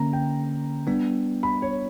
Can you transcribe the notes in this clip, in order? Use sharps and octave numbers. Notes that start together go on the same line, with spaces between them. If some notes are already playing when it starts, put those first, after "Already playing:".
Already playing: D3 A#3 C#4 A#5
G5
G3 B3 D4
B5
C#5